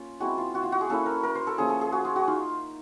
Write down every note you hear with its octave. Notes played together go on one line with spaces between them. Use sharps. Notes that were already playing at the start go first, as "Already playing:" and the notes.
Already playing: A#3 C#4 F4
G#3 C4 E4 F#4
F4
F#4
F4
F#4
G#4
A#3 C#4 E4 A4
A#4
A#4
C5
A4
F3 A#3 C#4 G#4
A4
G#4
F#4
F4
F#4
D#4 F4